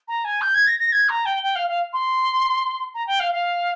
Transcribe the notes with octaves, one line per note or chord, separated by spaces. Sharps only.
A#5
G#5
G6
G#6
A#6
A#6
G#6
A#5
G5
G5
F5
F5
C6
A#5
G5
F5
F5